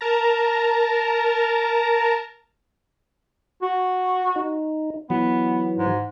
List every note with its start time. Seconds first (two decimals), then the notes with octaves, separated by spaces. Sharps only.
0.01 A#4 A5 A#5
3.62 F#4
4.36 D#4
5.10 E3 F#3 B3
5.78 G#2